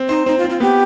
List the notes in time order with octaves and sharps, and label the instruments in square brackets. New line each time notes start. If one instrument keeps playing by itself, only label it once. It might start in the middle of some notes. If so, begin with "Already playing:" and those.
Already playing: [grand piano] C4
[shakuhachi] D#4 [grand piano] C5
[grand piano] C4 [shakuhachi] D#4
[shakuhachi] F4
[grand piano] C4
[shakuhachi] F4
[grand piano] B3 [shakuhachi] G4